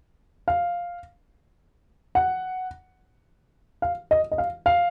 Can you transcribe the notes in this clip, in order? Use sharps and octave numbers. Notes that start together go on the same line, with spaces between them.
F5
F#5
F5
D#5
D#5
F5
F5